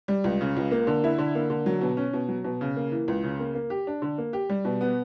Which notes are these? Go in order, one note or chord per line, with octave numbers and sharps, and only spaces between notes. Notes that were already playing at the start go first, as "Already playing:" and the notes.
G3
C#2
C#3
C#2
A#3
D3
E4
D3
A#3
D3
F#3
B2
C#4
B2
F#3
B2
C#3
A#3
E3
C#2
C#3
A#3
A#3
G4
D4
D3
A#3
G4
G3
B2
B3